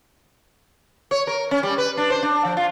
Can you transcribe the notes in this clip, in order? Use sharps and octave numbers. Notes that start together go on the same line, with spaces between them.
C#5
A#4
C#4
G3
B4
D4
C5
D4
F3
F4